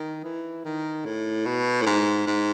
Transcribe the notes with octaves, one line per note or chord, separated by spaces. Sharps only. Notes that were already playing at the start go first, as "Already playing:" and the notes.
Already playing: D#3
E3
D#3
A2
B2
A2
G#2
G#2